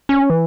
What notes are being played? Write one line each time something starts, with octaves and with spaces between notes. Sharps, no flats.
C#4
E3